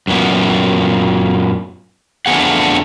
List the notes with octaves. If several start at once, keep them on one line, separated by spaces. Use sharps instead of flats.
F#2 A#2 B3
F2 D3 A3 B3 G#4 F#5